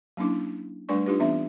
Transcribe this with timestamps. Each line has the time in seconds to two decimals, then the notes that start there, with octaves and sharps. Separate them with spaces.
0.17 F#3 A#3 C#4 D4 E4
0.89 G3 A3 D4 B4 D5 C#6
1.06 D4 D#4 F4 G4 B4
1.20 E3 B3 C4 D4 E5